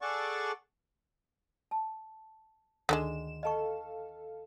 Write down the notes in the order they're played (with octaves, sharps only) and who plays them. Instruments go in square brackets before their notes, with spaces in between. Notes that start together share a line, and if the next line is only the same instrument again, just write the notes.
[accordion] G#4 A4 D5 F#5 A5 C#6
[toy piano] A5
[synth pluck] D2 D#3 E7 [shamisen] D3 G3 G#3
[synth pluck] A4 F5 [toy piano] D#5 A5 C#6